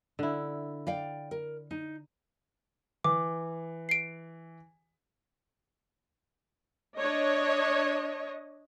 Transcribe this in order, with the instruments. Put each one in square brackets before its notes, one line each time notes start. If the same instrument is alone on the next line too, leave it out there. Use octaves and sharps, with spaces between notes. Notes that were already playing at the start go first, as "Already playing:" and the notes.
[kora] D3 E4
[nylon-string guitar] D5 F5 G5
A#4
D#4
[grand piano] E3 [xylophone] D6
[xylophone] C7 D7
[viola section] D4 C#5 D#5